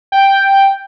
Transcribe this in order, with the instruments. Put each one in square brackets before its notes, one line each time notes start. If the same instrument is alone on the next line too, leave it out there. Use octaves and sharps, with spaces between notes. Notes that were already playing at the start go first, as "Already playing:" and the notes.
[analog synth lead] G5